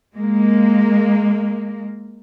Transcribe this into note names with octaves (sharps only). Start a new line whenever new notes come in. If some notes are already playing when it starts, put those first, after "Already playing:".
G#3 A#3